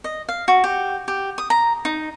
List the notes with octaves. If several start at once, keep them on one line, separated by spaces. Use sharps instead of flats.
D#5
F5
F#4
G4
G4
D#6
A#5
D#4